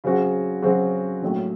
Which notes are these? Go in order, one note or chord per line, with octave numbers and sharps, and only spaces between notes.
C#3 F#3 C4 F#4
C#3 F#3 C4 F#4
A#1 A2 F#3